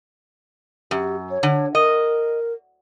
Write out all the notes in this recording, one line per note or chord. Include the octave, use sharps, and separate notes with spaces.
F#2 G4
C#5
D3
A#4 D#5